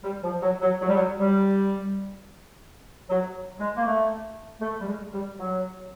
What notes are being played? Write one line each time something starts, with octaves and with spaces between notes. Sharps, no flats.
G3
F3
F#3
F#3
F#3
G3
F#3
G3
F#3
G#3
A#3
A3
A3
G3
G#3
G3
F#3